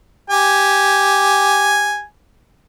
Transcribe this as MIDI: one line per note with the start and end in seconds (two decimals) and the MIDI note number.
0.30 2.04 67
0.30 2.04 80